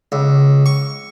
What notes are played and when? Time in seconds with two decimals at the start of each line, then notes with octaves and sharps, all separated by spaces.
0.12 C#2
0.66 C#6